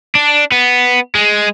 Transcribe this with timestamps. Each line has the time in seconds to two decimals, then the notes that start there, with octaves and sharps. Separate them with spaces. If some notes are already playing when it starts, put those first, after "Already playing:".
0.15 D4
0.52 B3
1.15 G#3